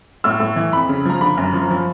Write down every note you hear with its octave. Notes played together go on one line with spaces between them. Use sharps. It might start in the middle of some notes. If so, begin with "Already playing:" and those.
A2 E6
A2
E3
F2 B5
C#3
F3 A#5
D3 B5
F#2
F3
F3